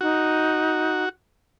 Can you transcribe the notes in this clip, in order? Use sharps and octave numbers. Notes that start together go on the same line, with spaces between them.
D#4 F#4